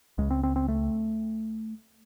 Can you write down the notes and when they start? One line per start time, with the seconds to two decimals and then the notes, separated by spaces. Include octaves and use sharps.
0.18 C#2 C#3 G#3
0.31 C4
0.43 C4
0.56 C4
0.68 A3